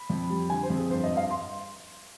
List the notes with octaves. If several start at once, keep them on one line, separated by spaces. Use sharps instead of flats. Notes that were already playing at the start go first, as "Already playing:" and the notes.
Already playing: B5
F2
G3
D3 G#5
C5
F2
G#4
G2 C5
D#5
G2
F5
C6